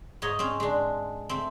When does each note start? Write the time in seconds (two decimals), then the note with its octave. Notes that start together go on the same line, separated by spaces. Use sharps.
0.22 G#2 D#4 C#5 D#5
0.39 C4 C#4
0.60 G#3 D4
1.29 A3 C4